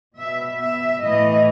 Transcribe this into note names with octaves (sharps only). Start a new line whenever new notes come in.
B2 E5
E5
A2 E3 D#5